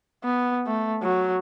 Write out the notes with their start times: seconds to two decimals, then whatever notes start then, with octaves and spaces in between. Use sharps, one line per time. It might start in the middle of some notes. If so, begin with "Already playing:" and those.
0.24 B3
0.66 A3
1.02 F#3